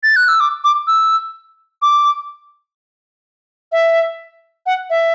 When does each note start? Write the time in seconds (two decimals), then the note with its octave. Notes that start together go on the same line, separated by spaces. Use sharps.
0.03 A6
0.16 F#6
0.28 E6
0.40 D6
0.64 D6
0.87 E6
1.82 D6
3.72 E5
4.66 F#5
4.90 E5